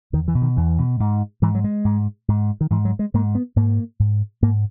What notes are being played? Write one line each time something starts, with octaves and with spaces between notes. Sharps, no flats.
E2 D#3
E3
B2
D#3
E2 E3
B2
G#2
G#2 E3
F#3
G#3
G#2
G#2
D#3
G#2 E3
F#3
G#3
G#2 A#3
B3
G#2 A#3
G#2
G#2 A#3